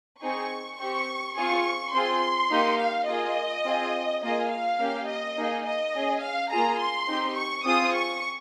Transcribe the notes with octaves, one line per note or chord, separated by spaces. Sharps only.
C4 D#4 G#4 C#6
C4 G4 C#6
C4 F4 G#4 C#6
C4 F4 G#4 C6
A#3 D#4 G4
F5
A#3 F4 G#4 D#5
C4 F4 G#4
A#3 F4 G#4 D#5
F5
A#3 C#4 G4
D#5
A#3 D#4 G#4
D#5
C#4 G#4
F5
A#3 F4 G#4 A#5
C6
C4 D#4 G4
C#6
C4 F4 G#4 D#6
C#6